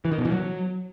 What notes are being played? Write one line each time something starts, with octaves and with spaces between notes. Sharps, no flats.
E3
D#3
B2
E3
F#3